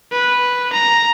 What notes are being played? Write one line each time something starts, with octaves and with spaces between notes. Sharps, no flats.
B4
A#5